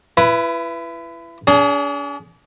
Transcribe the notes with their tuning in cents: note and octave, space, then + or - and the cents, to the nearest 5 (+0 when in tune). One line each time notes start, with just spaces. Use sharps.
E4 +30 B4 +0
D4 -45 G#4 +0